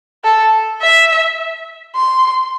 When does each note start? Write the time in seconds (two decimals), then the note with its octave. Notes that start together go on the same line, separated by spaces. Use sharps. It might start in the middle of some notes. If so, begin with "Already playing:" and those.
0.24 A4
0.81 E5
1.96 C6